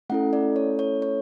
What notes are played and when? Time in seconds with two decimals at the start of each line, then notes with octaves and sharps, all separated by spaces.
0.10 A3 C#4 E4 A4 F#5
0.33 D5
0.56 C#5
0.79 C#5
1.02 C#5